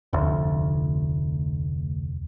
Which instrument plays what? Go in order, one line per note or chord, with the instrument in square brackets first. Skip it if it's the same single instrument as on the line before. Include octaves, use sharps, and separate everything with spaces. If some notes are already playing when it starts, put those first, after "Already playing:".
[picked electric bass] F1 D2